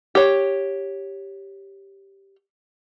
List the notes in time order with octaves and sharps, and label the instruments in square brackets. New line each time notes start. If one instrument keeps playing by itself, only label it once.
[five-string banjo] G4 C#5